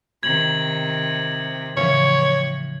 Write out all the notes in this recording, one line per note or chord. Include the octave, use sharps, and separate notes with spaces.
C3 D#3 G#6 F#7
A2 C#3 E3 F3 C#5